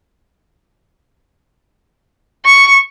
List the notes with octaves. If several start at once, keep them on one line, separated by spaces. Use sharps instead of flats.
C#6